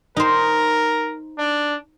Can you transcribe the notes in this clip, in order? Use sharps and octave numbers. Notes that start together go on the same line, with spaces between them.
D#4 A#4 C5
D4